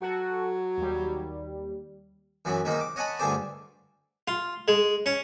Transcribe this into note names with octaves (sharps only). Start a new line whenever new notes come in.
F#3 F#4 A4
D#2 G3
F#2 E3 F#3 B3
G#2 C3 D#3 A#3 D#4
D6
C#5 D#5 F#5 G#5 A5 B5
D2 G2 D3 G#4 C5 D5
F4
G#3
C#4